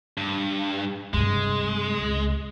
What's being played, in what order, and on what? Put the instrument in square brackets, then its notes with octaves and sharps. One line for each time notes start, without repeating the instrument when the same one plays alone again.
[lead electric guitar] G2
[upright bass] G2 C3 [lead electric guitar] G#3
[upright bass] C#2